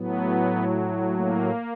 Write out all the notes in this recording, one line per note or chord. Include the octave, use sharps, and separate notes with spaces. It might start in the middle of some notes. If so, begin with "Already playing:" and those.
Already playing: A2 F#3 B3
A#3